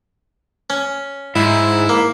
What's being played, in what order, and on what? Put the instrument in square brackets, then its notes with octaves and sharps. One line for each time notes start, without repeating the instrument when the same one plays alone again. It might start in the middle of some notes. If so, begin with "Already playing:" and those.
[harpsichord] C#4
[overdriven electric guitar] G#2 [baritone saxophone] E4
[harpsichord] A#3